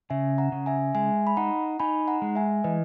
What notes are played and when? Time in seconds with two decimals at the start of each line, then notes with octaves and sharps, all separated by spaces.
0.10 C#3 E5 G#5
0.38 F#5 A#5
0.52 C#3
0.66 E5 G#5
0.95 G#3 E5 G#5
1.27 B5
1.37 D#4 F#5 A#5
1.80 D#4 G#5 B5
2.08 F#5 A#5
2.22 G#3
2.35 E5 G#5
2.64 E3 B4 D#5